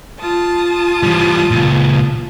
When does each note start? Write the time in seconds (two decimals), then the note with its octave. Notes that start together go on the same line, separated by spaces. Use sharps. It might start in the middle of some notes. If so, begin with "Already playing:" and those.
0.20 F4 A5 D#6
1.03 E3 G3
1.51 C#2 A#2